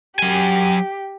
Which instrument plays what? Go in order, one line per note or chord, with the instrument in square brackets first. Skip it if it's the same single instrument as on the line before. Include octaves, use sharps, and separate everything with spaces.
[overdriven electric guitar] F#3 G#5 [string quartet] G4